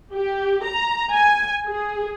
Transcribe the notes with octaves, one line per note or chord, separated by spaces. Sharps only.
G4
A#5
G#5
G#4